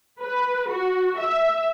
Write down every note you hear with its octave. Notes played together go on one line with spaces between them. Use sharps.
B4
F#4
E5